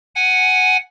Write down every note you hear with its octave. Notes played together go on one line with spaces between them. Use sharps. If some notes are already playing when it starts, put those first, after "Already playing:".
F#5 G#5